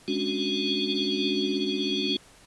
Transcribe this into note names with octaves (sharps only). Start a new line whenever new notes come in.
G#3 C#4 D4 F#4